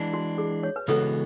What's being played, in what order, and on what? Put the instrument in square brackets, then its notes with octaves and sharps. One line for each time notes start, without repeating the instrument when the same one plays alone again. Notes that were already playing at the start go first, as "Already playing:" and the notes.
Already playing: [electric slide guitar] E3 G#3 D4
[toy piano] F#4
G#4
C#5
B4
[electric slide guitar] C#3 E3 G#3 B3 F#4 [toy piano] A4